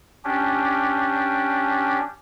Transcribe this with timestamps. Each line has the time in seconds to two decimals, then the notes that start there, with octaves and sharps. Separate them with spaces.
0.25 C#4 D4 G4